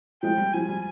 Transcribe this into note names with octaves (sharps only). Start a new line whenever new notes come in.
F3 G#3 G5
G3
F3 G#5
G3